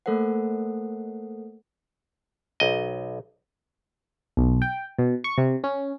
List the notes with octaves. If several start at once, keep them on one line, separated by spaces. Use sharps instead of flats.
A3 A#3 A4 A#4 C5 F#5
B1 D#5
B1
G5
B2
C#6
C3
C#4